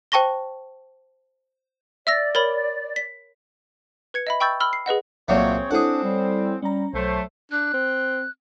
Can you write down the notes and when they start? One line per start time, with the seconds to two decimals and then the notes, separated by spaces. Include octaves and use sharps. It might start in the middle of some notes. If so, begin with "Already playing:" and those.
0.12 C5 G5 A5 C#6 A#6 G7
2.07 D5 E5 E6 A#6
2.35 A#4 C#5 B5
2.96 B6
4.14 B4 G#6 C#7
4.27 D#5 E5 B5
4.40 G5 B5 C#6 E6 G6 A6
4.60 B5 E6 F6 G7
4.73 C7
4.86 G#4 B4 D#5 F#5
5.28 C2 A#2 F#3 A3 C4 G#4 C#5 E5
5.71 C4 D4 E4 G#4 A4 C#5 F#5
6.03 G3
6.62 G3 C#4 A#5
6.93 B1 F#3 A3 C5
7.52 D4 F#6
7.74 C4